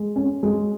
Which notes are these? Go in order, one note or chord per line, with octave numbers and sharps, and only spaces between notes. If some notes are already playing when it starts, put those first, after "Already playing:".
Already playing: G#3
C#4
G#3